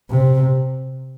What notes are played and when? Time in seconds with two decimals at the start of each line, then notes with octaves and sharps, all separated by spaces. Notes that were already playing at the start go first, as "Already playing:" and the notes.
0.10 C3